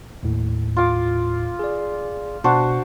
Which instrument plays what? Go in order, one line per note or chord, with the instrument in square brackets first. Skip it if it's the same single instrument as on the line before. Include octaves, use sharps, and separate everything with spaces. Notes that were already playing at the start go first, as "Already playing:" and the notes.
[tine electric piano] D#2 A2
[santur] F4 D6
[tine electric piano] G#4 D5
[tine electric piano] B2 [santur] D4 F#4 C5